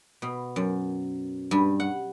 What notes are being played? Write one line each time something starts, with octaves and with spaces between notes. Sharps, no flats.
B2
F#2
G2
F#5